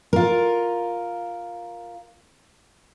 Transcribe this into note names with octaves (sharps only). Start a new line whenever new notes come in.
F4 A#4